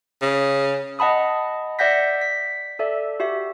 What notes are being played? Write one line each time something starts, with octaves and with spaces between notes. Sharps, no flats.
C#3
D#5 F#5 A5 B5 D#6
D5 E5 F#5 G6 A#6 B6
B6
A4 D5 E5
F#4 G4 E5